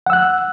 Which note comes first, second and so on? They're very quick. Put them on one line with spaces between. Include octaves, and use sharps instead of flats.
F#5 E6 F#6